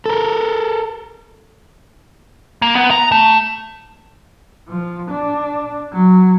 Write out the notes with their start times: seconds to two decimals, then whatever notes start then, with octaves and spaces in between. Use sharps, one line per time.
0.06 A4 A#4
2.62 A#3
2.75 B3
2.91 A#5
3.12 A3
4.69 F3
5.10 D4
5.93 F#3